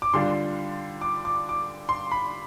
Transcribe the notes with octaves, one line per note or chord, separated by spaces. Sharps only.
D6
D3 G3 D4 F4 C6
D6
D6
D6
C6
B5